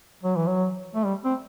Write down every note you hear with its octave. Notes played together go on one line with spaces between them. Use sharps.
F#3
E3
F#3
A3
G3
C4